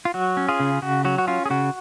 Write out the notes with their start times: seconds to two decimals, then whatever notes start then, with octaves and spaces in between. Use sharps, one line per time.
0.05 F4
0.14 F#3 F#4
0.37 C#4
0.48 F4 G#4
0.60 C#3
0.82 C#3 F#4
1.05 F#3 F#4
1.18 F#4
1.27 C#4 F4
1.46 G#4
1.50 C#3 F#4